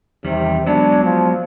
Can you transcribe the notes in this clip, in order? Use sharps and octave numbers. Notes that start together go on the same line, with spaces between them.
E2 C3 D#3 G3
F#3 G#3 B3 D4
F3